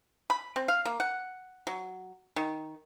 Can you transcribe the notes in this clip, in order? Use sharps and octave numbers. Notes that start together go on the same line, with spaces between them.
B5
C4
F5
A#3
F#5
F#3
D#3